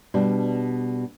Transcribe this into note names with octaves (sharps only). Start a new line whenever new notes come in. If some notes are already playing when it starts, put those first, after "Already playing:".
B2 G3 D4